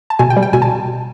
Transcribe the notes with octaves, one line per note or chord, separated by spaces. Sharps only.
A5
B2 G#5
G5
G3
G5
B2 G#5
A5